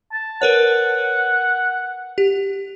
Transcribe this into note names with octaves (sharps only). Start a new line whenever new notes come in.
A5
A#4 B4 C#5 F#5
G4